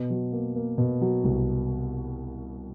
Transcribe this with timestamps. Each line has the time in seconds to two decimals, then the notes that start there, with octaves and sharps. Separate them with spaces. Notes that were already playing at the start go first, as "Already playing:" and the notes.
Already playing: B2
0.10 F#3
0.32 A#3
0.56 A#3
0.78 B2
1.01 F#3
1.24 C2